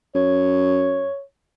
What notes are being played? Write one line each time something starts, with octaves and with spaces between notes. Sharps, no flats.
F#2 C#5